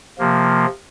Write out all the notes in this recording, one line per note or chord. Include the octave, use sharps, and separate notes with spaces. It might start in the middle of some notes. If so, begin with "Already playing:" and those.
C3 F3 A#3